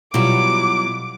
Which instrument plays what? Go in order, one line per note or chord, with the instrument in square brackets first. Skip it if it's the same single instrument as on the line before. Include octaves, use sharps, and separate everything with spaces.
[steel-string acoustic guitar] B2 F#3 [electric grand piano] G3 E4 F4 [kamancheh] D6